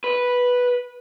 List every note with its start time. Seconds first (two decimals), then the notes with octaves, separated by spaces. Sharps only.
0.04 B4